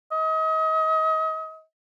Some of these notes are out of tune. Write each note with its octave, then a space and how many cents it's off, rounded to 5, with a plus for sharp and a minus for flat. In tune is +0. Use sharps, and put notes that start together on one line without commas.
D#5 +35